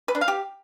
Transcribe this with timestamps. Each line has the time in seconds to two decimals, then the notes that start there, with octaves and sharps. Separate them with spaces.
0.08 B4
0.15 D4
0.21 F5
0.28 G4